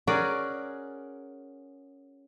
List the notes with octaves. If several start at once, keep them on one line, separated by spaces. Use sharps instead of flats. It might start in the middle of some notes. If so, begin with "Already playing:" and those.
C#4 F#4 G#4 A#4 D5